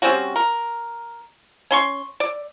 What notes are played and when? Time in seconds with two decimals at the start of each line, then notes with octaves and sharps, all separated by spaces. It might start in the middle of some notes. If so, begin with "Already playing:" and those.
0.02 G3 C4 C#4 F#4
0.36 A#4
1.71 C#4 C6 C#6
2.20 D5